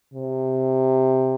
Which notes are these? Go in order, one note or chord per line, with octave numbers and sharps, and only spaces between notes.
C3